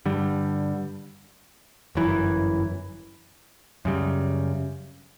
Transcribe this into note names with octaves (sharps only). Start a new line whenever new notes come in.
G2 D3 G3
G1 F#2 E3
F#2 C#3 G3